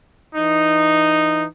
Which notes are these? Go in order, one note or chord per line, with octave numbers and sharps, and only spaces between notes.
E3 D#4